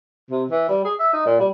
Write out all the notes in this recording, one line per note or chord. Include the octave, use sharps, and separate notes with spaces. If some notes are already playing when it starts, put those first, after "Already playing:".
C3
E3
G3
G#4
E5
D#4
A#2
G3